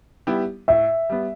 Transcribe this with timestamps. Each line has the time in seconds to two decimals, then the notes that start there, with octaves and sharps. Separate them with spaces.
0.27 G3 B3 E4 G4
0.68 A2 E5
1.10 G3 B3